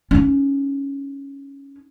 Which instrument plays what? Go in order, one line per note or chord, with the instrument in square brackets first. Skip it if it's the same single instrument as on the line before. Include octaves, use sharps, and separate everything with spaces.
[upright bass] C#4 D#4